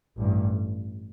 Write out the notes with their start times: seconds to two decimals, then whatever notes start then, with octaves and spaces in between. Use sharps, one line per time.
0.16 A1 G2